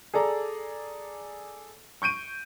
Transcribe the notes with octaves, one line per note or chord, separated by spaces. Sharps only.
G#4 A4 D5 A#5
C#6 G6 D7 D#7